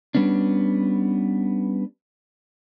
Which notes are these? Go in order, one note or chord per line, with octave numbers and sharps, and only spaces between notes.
G3 B3 C#4 D4